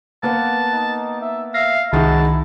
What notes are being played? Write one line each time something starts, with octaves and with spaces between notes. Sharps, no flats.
A#3 B3 F#5 A5
D#4
E5
E5 F5 A#6
C2 D#3 G#3 D#4 E4 F#4 A5